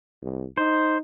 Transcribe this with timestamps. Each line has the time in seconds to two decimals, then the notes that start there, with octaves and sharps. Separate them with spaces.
0.22 C2
0.57 D#4 C5